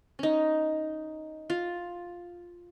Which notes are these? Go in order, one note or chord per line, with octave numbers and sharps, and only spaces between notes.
C#4 D#4
F4